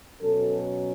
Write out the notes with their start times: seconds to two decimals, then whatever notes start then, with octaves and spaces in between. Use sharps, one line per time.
0.21 B2 F#3 C#4 A4